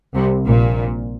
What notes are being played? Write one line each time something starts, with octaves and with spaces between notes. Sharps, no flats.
C2 C3
A#1 A#2